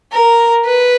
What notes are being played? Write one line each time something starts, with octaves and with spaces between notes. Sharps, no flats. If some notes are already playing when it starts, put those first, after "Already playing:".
A#4
B4